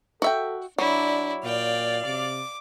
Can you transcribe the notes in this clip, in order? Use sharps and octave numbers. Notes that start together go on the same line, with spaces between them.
F#4 A4 E5 G5
F#3 D4 E4 D5
A#2 D5 F5 G5
C3 D6